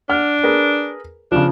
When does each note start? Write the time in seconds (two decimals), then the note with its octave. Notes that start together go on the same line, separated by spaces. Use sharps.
0.09 D4 F#5 F6
0.44 G#4 A#4 B4
1.32 C#3 F3 D4